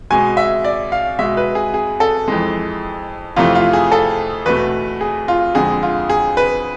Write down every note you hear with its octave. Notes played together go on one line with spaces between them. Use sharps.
B2 G#3 G#5
E5
D5
F5
B2 G#3 E5
B4
G#4
G#4
A4
F2 E3 G#3
F2 C3 E3 A3 F4
F4
G#4
A4
E2 B2 A3 B4
G#4
F4
F2 D3 G#3 G#4
F4
G#4
B4